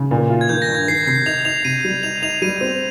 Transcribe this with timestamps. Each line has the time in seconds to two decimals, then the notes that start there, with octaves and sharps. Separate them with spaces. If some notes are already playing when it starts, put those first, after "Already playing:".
Already playing: C#3
0.11 A#2
0.30 F4
0.41 G#6
0.49 D#3 G6
0.62 A#6
0.68 G2
0.75 G#6
0.88 D#3 C7
1.07 C3 C7
1.26 D#4 F7
1.45 D#4 F7
1.65 C3 D#7
1.85 G3
2.03 D#4 F7
2.22 D#4 F7
2.42 G3 D#7
2.61 C4